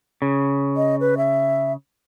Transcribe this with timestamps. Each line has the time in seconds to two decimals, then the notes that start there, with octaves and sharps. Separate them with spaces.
0.22 C#3
0.77 D#5
1.00 B4
1.17 E5